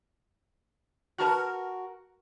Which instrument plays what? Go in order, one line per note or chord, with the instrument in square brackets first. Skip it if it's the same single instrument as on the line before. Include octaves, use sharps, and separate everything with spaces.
[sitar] F#4 A#4 [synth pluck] B4 A5 F6